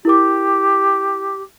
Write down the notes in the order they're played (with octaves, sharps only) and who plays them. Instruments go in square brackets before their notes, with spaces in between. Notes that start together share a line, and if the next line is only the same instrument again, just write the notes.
[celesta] E4 A#4 D6 [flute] G4